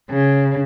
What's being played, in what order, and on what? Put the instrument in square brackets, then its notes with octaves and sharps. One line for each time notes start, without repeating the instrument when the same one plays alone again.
[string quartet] C#3